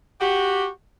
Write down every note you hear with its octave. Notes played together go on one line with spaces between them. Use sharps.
F#4 G4